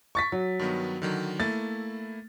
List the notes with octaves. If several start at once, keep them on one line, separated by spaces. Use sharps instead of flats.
C#6 A6 B6
F#3
G2 D#3 B3
D3 D#3 F#3
A3 A#3 E4 A6